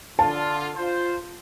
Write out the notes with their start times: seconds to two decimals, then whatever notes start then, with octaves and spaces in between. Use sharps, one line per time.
0.19 D3 F4 A5
0.75 F4 C5